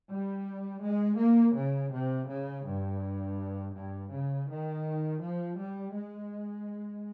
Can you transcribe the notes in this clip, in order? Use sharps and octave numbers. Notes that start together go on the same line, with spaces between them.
G3
G#3
A#3
C#3
C3
C#3
G2
G2
C#3
D#3
F3
G3
G#3